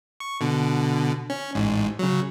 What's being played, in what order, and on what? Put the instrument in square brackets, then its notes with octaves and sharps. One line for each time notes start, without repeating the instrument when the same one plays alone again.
[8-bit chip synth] C#6
B2 D3
C#4
A1 G#2
C#3 F#3